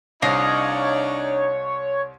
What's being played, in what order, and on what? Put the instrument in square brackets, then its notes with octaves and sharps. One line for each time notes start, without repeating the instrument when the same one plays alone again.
[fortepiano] C2 [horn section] D4 D#4 [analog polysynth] C#5 [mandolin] D#5 F5